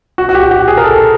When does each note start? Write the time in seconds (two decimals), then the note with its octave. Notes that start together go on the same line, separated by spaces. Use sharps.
0.18 F#4
0.29 F#4
0.35 G4
0.51 G4
0.68 G#4
0.77 A#4
0.84 A4